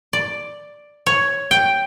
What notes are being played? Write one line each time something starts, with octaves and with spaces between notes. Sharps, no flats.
D5
C#5
G5